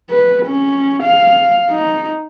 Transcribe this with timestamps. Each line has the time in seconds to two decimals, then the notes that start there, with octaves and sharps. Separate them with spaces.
0.10 B4
0.46 C#4
1.03 F5
1.71 D#4